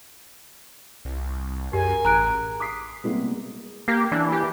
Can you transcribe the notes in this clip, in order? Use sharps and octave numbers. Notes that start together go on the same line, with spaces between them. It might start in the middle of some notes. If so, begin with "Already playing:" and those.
C2
F#2 G4 G#4 A#4 G#5
A1 A#5 F#6 D7
D6 D#6 B6 C7
C3 G3 G#3 A#3 B3
A#3 G4
E3 D4
G4